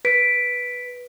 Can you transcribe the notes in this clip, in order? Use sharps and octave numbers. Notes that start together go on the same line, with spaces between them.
B4 B6 D7